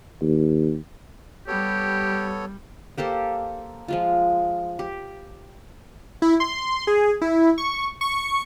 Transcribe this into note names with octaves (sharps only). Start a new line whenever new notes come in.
D#2
G3 B3 G4 A4 C#5
A#3 G4 A4 C5
F3 G#3 F4
G4
E4
C6
G#4
E4
C#6
C#6